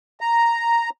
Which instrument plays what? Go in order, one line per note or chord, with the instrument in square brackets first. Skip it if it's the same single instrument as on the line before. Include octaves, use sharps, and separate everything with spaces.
[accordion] A#5